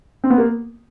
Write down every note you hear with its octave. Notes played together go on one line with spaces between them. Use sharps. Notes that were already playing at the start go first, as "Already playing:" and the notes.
C4
B3
A#3